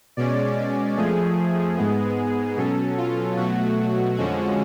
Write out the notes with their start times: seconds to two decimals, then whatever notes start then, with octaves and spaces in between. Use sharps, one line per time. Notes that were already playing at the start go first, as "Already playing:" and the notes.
0.17 B2 G#3 C#4 D5
0.57 D5
0.97 F2 F3 A3 G#4
1.77 G#2 G#3 B3
2.57 B2 F#3 C#4 A4
2.98 F4
3.37 B2 F#3 A3 F#4
4.17 F2 D3 F3 G#3 C#4 F#4